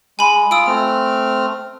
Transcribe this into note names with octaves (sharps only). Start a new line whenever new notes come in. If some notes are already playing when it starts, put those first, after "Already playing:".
G#3 G#5 B5
F4 D#6 E6 D7
A3 C4 F6